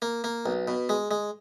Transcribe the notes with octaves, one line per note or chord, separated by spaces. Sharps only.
A#3
A#3
B1
B2
G#3
G#3